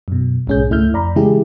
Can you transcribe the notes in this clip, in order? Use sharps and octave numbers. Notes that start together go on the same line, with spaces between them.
F#2 B2
B1 G#2 C#4 G#4 G6
C#2 A3 E4 E5 F6 G6
F2 D5 A#5 B5
C#3 E3 G#3 E4 G4 G#4